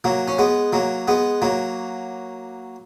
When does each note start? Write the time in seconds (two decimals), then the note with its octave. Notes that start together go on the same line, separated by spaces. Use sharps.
0.04 F#3 A#3
0.28 C#4
0.39 G#3 B3
0.73 F#3 A#3
1.08 G#3 B3
1.42 F#3 A#3